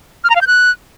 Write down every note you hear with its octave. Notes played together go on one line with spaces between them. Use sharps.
F6
A#5
F5
G6
F#6